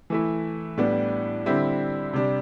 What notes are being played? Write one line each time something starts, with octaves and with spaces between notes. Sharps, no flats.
E3 A3 E4
A2 G3 B3 D4
D3 G3 C4 E4
C3 G3 D4